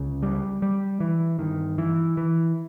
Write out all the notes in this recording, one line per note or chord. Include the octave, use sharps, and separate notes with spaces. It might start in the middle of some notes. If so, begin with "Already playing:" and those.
Already playing: C#2 C#3
G3
G3
E3
G2 D#3
E3
E3